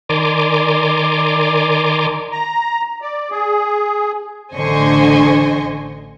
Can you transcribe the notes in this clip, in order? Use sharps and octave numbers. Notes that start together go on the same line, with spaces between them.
D#3 D5 G#5 A#5 C6 D6
A#5
D5
G#4
A1 D3 C5 D#5 G#5 C#6